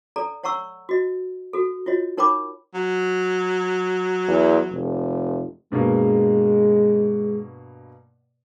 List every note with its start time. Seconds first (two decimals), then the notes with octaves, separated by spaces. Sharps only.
0.16 A4 D5 A#5
0.44 C#5 F#5 A#5 C#6 E6
0.89 F#4 D#5
1.53 F#4 A4
1.86 F4 F#4 C#5 D#5
2.17 D#4 A#4 C#5 G5 B5 D6
2.74 F#3
4.28 E2
4.71 F1
5.72 G2 B2 G#3 A#3